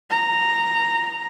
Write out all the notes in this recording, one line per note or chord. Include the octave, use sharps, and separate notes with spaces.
A#5